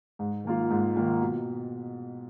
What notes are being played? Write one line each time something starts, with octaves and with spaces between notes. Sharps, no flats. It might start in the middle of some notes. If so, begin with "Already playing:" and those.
G#2
D#3 A#3 F4
G#2
D#3 A#3 F4
B2